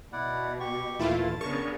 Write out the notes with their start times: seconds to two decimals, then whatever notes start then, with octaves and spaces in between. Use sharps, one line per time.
0.13 B2 E4 D5 F#5
0.60 G4 C#6
0.99 D#2 A#2 E3 A3 E4 F4 A5
1.41 C#3 B3 D4 G#4 A#4 C#6